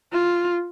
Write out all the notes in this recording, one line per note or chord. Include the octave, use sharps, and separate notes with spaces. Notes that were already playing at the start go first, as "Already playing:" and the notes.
F4